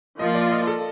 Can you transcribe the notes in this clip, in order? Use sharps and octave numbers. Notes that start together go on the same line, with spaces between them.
F3 A#3 F4 D#5
D5
D#5
A4